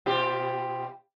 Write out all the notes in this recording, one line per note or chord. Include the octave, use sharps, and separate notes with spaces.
B2 F4 G4